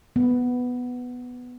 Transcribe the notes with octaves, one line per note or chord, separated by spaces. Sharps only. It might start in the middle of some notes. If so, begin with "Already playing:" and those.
B3